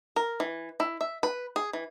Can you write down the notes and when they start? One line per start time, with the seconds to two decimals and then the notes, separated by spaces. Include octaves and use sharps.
0.16 A#4
0.40 E3
0.80 E4
1.01 E5
1.23 B4
1.56 G#4
1.73 E3